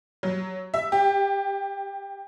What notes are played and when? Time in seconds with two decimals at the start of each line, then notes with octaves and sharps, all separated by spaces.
0.23 F#3
0.74 E5
0.92 G4